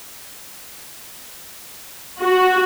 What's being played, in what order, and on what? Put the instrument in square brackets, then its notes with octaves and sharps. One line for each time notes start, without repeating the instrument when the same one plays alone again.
[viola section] F#4